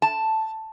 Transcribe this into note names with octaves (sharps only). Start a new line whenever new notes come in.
A5